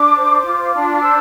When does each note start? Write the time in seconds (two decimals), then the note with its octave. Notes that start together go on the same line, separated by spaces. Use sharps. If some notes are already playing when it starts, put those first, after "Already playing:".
Already playing: D4 D6
0.16 C5
0.45 F4
0.74 D4
0.96 D6
1.02 C5 E6